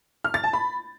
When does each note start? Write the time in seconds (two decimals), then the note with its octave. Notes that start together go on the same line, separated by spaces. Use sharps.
0.24 F6
0.34 A6
0.44 A5
0.53 B5